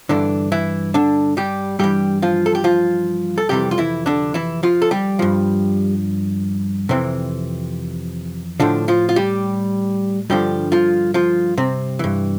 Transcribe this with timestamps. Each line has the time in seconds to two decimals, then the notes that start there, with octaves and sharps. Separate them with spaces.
0.09 G2 D3 E3 D4
0.52 E3 E4
0.94 D3 D4
1.37 G3 G4
1.79 G2 E3 G3 G4
2.22 F3 F4
2.46 A4
2.55 G4
2.64 F3 F4
3.38 A4
3.49 F2 C3 E3 G3 G4
3.71 F4
3.78 E3 E4
4.06 D3 D4
4.34 E3 E4
4.63 F3 F4
4.82 A4
4.91 G3 G4
5.19 G2 F3
6.89 F2 C3 E3 C4
8.60 A2 D3 F3 D4
8.88 F3 F4
9.09 F4
9.16 G3 G4
10.30 G2 D3 F3 G3 G4
10.72 F3 F4
11.14 F3 F4
11.58 C3 C4
11.99 G2 E3